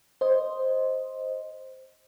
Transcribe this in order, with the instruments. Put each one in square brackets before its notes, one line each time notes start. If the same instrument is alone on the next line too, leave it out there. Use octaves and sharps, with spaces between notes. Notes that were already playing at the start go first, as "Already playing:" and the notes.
[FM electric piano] C5 D#5